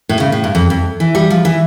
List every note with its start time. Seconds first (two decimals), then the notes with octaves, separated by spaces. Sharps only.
0.09 A2
0.20 C#3
0.32 A2
0.44 G2
0.55 F2
0.70 F2
1.00 E3
1.15 G3
1.30 F3
1.45 E3